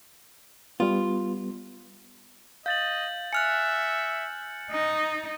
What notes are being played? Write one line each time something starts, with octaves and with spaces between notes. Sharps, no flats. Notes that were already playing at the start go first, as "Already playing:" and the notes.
G3 B3 F4
D#5 F5 G6 A6 F#7
E5 G#5 F6 F#6 C#7
D#4 D#5